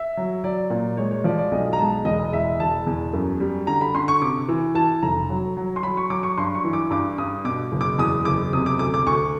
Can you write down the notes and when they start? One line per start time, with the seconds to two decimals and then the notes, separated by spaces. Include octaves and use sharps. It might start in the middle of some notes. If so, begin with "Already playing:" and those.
Already playing: E5
0.17 F#3
0.44 F#3 D5
0.70 A#2
0.97 G#3 C#5
1.11 C#5
1.24 F3 D5
1.38 D5
1.51 B1 D#5
1.73 A#5
1.78 G#3 A5
2.05 E1 D#5
2.32 E2 E5
2.60 E1 A5
2.87 E2
3.13 F#2
3.40 G3
3.67 D3 A#5
3.81 B5
3.94 D3 C6
4.08 C#6
4.22 C3 D6
4.48 E3
4.75 E3 A5
5.03 F1 A#5
5.29 F#3
5.57 F#3
5.76 C6
5.83 F#3 B5
5.97 C#6
6.10 F#3 D6
6.23 C#6
6.38 G2 C6
6.55 C#6
6.65 E3
6.73 D6
6.90 G2 D6
7.18 G2 D#6
7.45 B2 D6
7.72 F#1
7.81 D6
7.98 E2 D#6
8.25 F#1 D6
8.53 C3 D#6
8.66 D6
8.79 D2 D6
8.94 D6
9.06 D2 C#6